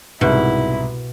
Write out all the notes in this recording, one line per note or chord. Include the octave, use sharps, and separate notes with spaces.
C2 G#2 B2 E4